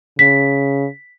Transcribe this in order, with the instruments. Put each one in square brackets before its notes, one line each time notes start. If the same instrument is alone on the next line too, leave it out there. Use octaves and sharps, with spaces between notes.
[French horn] C#3 [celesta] B6